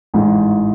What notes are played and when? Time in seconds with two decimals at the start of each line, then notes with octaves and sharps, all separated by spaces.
0.14 A1 G#2 E3